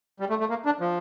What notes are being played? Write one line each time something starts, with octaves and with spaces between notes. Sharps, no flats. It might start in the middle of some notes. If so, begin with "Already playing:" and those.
G3
A3
A3
A#3
D4
F3